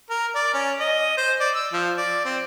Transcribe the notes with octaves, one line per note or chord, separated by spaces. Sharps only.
A#4
D5
C#4
D#5
C5
D5
E6
F3
D5
C4